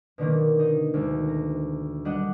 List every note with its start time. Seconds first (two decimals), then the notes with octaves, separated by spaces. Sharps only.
0.18 B2 D3 D#3 A#3
0.59 D#4
0.94 D2 G#3
1.28 A#5
2.05 G3 D4 G4 D#5 F#5